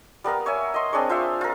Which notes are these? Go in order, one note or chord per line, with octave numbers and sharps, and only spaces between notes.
G3 B3 A#4 F5
C#5 E5 G#5
D#5 C6
C4 D4 G#4 C#5
F4 C5 E5 F5
F4 A#4